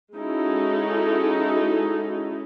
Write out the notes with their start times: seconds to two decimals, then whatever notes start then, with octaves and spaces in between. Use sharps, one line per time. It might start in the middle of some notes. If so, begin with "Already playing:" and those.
0.14 G#3 C#4 D#4 E4 F#4 A4